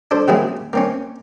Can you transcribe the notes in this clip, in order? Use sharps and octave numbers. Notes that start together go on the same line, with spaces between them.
D4 A4 C5
C#3 F#3 A#3 C4 E4 G#4
A#3 C4 C#4